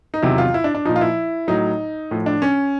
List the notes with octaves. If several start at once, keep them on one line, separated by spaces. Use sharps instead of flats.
D#4
E2 C3 D#3 F#3 E4
F4
E4
D4
D4
A#2 F3 D#4
F4
E4
A2 F#3 D#4
A2 F3
D4
C#4